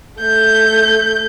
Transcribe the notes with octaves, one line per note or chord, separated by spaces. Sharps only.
A3 G6